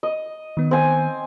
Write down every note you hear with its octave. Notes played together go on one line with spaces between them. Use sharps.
D#5
D#3 B3
C4 G#5